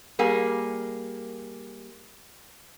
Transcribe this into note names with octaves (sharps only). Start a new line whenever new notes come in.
G3 A#3 G#4